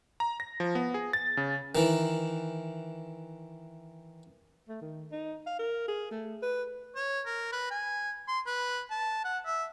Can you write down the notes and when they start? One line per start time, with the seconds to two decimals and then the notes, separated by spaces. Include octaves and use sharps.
0.20 A#5
0.40 A#6
0.60 F3
0.75 B3
0.94 G#4
1.13 A6
1.37 C#3
1.75 D#3 E3
4.69 A3
4.81 D#3
5.12 D#4
5.47 F5
5.59 A#4
5.88 G#4
6.11 A3
6.42 B4
6.96 C#5
7.26 A#4
7.52 B4
7.71 G#5
8.28 C6
8.46 B4
8.90 A5
9.25 F#5
9.46 E5